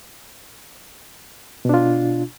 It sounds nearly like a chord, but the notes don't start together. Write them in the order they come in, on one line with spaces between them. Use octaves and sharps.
B2 D4 F4